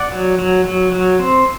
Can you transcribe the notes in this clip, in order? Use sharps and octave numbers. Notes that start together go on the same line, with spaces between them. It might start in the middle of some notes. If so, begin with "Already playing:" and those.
Already playing: D5 F#5
F#3
F#3
F#3
F#3
C4